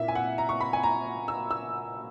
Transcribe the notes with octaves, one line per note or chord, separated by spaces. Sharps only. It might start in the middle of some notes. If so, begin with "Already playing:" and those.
Already playing: A#2 A#3 E4 E5
G#5
F#5
A#5
C#6
B5
G#5
A#5
E6
E6